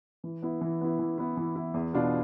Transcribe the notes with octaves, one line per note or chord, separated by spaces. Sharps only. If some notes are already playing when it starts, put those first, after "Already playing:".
E3
B3 E4
E3
B3 E4
E3
B3 E4
E3
B3 E4
E2
B2 B3 D4 F4